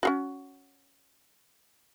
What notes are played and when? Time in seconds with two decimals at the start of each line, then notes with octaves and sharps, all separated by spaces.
0.03 C#4 F4 F#4